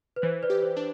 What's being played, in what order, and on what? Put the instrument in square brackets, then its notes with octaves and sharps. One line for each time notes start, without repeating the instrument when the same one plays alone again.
[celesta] B4
[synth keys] E3 [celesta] C5
[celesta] B4 D5
[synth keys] G4
[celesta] C5
[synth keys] D4